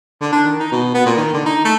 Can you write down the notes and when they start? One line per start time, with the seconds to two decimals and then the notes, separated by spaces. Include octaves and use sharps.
0.21 D3
0.32 D4
0.44 D#3
0.59 D#4
0.72 B2
0.94 B3
1.06 A#2
1.17 D#3
1.34 D3
1.46 D#4
1.64 A3